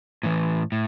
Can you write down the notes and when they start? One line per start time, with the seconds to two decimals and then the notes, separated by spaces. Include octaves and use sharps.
0.23 A2 E3
0.72 A2